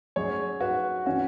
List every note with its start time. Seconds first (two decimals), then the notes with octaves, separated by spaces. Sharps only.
0.16 F#2 F#3 G#4 C#5
0.61 F#4 B4
1.06 E3 C#4 F#4